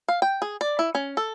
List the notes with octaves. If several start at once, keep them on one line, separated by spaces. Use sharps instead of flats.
F5
G5
G#4
D5
E4
C#4
A4